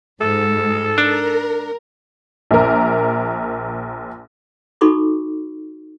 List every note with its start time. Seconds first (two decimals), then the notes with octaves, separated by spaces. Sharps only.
0.21 G#2 A4
0.98 D4 A#4
2.51 A#1 A#4
4.81 D#4 F#4 A4 B5 C#6 D6